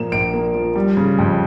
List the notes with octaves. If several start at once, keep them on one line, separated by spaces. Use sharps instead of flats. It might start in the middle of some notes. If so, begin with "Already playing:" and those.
Already playing: A#2 F3 A#3 E7
A#1 D7
A#3
F3
G3
C#3
F2